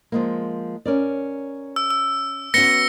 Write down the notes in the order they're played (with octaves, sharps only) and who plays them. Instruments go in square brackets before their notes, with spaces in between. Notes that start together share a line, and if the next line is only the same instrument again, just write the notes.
[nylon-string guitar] F3 G#3 A#3
C#4 A#4 D5
[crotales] E6
E6
[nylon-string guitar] B3 C#4 F#4 [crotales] A#6 C#7 G7